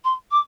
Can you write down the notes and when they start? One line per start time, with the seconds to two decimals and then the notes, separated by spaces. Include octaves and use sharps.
0.04 C6
0.31 D6